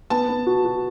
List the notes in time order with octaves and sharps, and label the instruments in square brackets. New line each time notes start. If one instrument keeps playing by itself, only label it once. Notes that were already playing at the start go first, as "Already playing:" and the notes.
[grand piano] B3 [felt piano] A5
[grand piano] B3
F#4
F#4